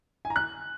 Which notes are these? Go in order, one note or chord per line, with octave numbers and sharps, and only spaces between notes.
G#5
A#5
F#6